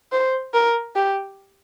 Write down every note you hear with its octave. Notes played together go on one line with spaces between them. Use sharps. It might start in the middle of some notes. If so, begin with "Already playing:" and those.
C5
A#4
G4